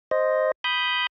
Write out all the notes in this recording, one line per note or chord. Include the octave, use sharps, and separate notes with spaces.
C5 D#5
B5 D#6 G6